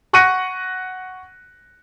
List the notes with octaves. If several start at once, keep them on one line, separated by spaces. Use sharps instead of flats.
F#5 C#6 F#6 A#6 C#7 D#7